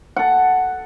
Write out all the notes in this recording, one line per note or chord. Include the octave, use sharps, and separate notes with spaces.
A4 F#5